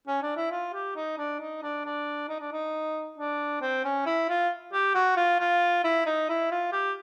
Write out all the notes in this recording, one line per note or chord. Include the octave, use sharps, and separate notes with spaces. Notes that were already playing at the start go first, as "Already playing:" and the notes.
C#4
D4
E4
F4
G4
D#4
D4
D#4
D4
D4
D#4
D4
D#4
D4
C4
C#4
E4
F4
G4
F#4
F4
F4
E4
D#4
E4
F4
G4